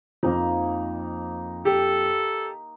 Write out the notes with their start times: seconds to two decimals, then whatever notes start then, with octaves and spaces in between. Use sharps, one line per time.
0.23 F2 F3 A#3 D#4
1.65 G4 A4